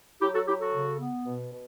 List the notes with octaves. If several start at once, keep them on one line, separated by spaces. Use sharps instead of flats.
F#3 E4 G4
F#4 A4
F#3 E4 G4
F#4 A4
C#3
B3
B2
B2